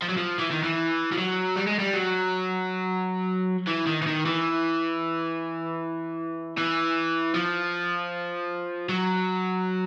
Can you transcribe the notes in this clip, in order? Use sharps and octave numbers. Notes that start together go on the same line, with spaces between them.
F3
F#3
F3
E3
D#3
E3
F3
F#3
G3
G#3
G3
F#3
E3
D#3
E3
D#3
E3
E3
F3
F#3